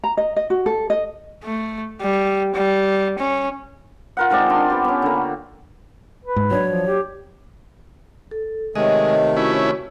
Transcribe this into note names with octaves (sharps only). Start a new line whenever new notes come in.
A#5
D#5
D#5
F#4
A4
D#5
A3
G3
G3
C#4
F4 A#4 F#5
D#3 G#3 C4 D5
D4 C6
B3 G4
B3 C#4
D3 A#3
B4
G#2
F#3 C#4 D4 C#5
F3
G4
A4
C3 D#3 G#3 A3 C#5 D#5
C#4 E4 F#4 C#5